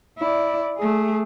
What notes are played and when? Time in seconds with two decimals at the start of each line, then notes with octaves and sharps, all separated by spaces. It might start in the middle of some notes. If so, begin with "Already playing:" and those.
0.19 E4 D5
0.78 A3 G#4